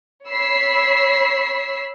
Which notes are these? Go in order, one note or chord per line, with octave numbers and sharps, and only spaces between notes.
C#5 B5 E6 B6 C7